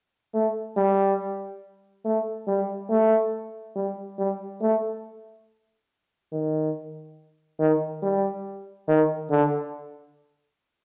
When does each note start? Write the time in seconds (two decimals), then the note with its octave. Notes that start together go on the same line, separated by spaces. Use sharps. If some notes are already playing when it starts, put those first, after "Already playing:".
0.34 A3
0.76 G3
2.05 A3
2.47 G3
2.90 A3
3.76 G3
4.18 G3
4.61 A3
6.32 D#3
7.59 D#3
8.02 G3
8.88 D#3
9.30 D3